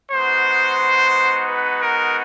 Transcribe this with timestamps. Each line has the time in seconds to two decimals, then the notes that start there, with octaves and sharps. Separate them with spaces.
0.12 G#3 B3 D#4 F#4 C5
1.48 B4
1.82 A#4